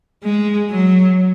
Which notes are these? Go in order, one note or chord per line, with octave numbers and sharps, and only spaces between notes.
G#3
F#3